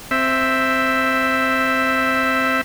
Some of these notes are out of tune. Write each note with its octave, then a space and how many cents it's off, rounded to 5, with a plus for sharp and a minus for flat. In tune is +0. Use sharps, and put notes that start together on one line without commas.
C4 +0 E5 +0